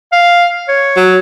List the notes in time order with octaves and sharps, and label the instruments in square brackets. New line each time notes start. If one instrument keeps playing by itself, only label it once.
[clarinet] F5
C#5
[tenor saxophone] F#3